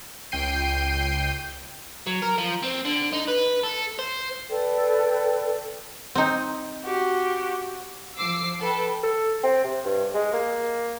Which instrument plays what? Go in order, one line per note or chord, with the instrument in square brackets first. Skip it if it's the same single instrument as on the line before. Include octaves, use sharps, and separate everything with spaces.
[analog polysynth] C#2 G5 G6 C7 D#7
[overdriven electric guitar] F#3
A#4
F3
C4
D3
D#4
B4
A4
C5
[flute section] A4 B4 D5 G5
[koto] C4 D#4
[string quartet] F#4 G4
[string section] F3 D6 E6 C7
A4 B4 G5
[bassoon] A4
C4
C3
G2
G#3
A#3